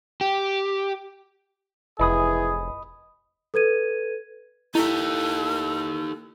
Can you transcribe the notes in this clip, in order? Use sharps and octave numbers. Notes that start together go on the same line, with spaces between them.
G4
F1 E3 G#4 D#5 B5 D#6
A4 B4 G#6 D#7
D#4 E4 G4 A4